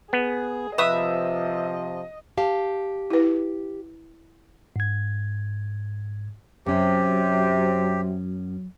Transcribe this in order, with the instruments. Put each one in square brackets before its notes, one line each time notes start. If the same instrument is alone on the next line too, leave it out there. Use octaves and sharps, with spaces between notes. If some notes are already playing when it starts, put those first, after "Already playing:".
[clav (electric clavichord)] B3 [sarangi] G#4
[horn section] C3 F3 [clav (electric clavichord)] B4 [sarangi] D#5 [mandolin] E5 D#6
[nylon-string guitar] G4 F5 A5
[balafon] E4 B4
[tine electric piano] G#2 G#6
[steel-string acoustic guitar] F#2 C#4 [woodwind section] C3 [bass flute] F#3 [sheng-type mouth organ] G4